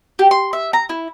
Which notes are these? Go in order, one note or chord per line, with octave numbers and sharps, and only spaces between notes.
G4
C6
E5
A#5
E4